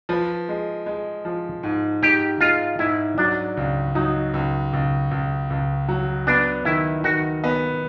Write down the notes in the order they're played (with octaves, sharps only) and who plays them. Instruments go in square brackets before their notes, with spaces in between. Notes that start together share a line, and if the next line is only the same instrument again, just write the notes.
[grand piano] F3 [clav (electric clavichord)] B4
[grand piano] G#3
G#3
F3
G#2
[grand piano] G#2 [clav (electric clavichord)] G4
[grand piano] G#3 [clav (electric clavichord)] F4
[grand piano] G#2 [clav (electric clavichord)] E4
[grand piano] F#3 [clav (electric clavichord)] D4
[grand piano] C#2
[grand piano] F#3 [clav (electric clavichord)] D#4
[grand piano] C#2
C#2
C#2
C#2
F#3
[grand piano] B3 [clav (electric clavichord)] D4
[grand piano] D#3 [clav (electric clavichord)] E4
[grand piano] D#3 [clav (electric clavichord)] F#4
[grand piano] B3